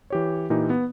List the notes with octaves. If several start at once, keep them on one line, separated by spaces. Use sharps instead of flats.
E3 G4 C#5
A#2 E3 D#4 G4
B3